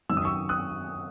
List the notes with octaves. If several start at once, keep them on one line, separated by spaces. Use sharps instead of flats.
F#2 D#3 F#3 E6
D#6
C#6 E6
D#6 F#6